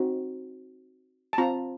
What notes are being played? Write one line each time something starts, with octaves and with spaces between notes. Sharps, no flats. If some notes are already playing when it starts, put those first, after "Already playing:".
Already playing: C4 D#4 F#4
A5
C4 F4 A#5